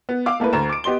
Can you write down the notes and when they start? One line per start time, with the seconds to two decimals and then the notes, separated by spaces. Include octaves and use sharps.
0.09 B3
0.26 F5 D6 E6
0.40 A3 A#3 E4 B4
0.53 D2 A#5 E7
0.70 D6 D7
0.84 B3 G4 D#5 C6 G7